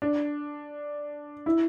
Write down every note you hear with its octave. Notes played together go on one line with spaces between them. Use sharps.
D4
E4